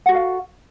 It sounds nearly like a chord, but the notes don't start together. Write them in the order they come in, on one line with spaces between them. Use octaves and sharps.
F#5 F#4 A4 F5